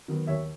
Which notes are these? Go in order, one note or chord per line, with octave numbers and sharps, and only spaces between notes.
D#3 F#3 B3
D#2 C#5 E5